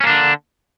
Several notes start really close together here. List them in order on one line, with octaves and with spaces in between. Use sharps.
C#4 A#3 D4 D3